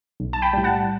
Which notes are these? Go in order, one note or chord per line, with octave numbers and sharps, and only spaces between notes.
B1
A5
G5 B5
A2 G3
F#5 A5